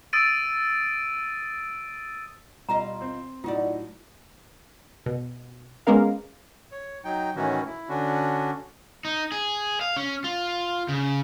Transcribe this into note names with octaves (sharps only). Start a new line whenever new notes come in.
D#6 E6 A6 D7 D#7
B2 G3 F4 D#5 A#5
C4 C5
A2 F#3 D#4 F4 F#4 D5
B2
G#3 A#3 B3 C#4 A#4 F5
C#5
F#3 D#4 G5
A2 D#3 E3 C#4 F#4
E4
D3 C#4 D4 F#4
D#4
G#4
F5
C#4
F4
C#3